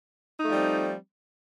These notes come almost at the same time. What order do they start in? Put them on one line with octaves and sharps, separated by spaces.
D#4 A3 F3 G3 C4